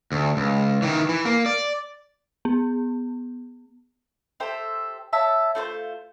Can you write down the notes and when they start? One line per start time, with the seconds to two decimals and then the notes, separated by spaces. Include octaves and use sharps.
0.12 D2
0.37 C#2
0.82 D#3 E3
1.09 E3
1.25 A#3
1.46 D5
2.45 B3
4.40 G4 A4 C5 E5
5.13 C#5 E5 A5
5.55 A3 F4 A4 C5